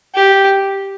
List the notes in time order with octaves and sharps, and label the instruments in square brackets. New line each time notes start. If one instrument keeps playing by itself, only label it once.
[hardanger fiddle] G4